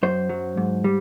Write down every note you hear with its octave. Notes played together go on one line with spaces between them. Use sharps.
F#2 C5
F#3
G#2
G3